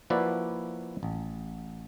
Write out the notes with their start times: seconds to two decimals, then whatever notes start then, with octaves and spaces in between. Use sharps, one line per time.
0.10 F3 A#3 E4 F#4 B4 D5
1.03 A1